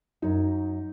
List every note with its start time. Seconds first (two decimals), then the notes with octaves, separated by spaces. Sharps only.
0.22 F#2 D#4